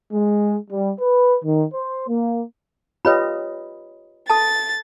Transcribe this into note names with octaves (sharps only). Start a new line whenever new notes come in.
G#3
G3
B4
D#3
C5
A#3
F4 G4 B4 C#5 D#5 B5
A4 A5 A6